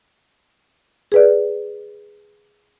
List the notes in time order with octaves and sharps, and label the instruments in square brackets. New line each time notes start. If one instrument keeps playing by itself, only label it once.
[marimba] G#4 B4 D5